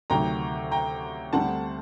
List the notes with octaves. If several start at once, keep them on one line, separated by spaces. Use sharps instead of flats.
D2 C3 D#3 F#3 G5 A#5
G5 A#5
D2 D3 G3 C4 F#5 A5